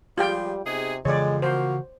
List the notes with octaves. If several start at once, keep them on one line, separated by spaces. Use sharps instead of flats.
F3 G3 G#3 F4 G4 G5
C3 B3 D#4 G#4
F2 C#3 E3 G#3 C#5 D5
F3 A#3 F#4 C5